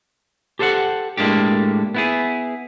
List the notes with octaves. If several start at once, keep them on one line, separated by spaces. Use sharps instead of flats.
G4 A4 C5 E5 F#5
A2 G#3 A#3 D4 G4
B3 E4 G#4